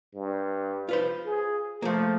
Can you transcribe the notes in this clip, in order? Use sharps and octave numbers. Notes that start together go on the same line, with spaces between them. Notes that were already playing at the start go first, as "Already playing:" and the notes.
G2
F4 B4 C5
G#4
F3 A3 A#3